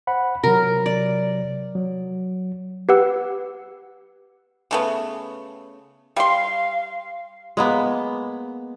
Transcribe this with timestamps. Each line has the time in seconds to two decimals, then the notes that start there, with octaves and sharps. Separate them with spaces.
0.07 C5 F#5 B5
0.43 C3 F#3 A#4
0.86 D5
1.75 F#3
2.89 G4 B4 F#5 E6
4.71 C#3 A3 B3
6.17 G3 F5 C6
7.57 G#3 A#3 B3